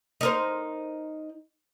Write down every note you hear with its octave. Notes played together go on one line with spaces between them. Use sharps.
D#4 A#4 C5